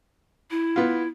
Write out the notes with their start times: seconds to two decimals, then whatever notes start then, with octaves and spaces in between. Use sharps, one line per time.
0.51 E4
0.76 B3 F4